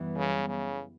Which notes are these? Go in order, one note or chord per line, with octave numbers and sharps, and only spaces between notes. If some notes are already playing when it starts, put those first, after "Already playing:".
Already playing: F#2 E3 G3 B3
C#3
C#3